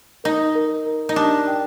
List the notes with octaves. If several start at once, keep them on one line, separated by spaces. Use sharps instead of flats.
D#4 A#4
A#4
A#4
D#4
D4 G4
G5